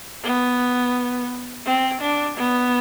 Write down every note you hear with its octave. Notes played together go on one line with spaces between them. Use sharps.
B3
C4
D4
B3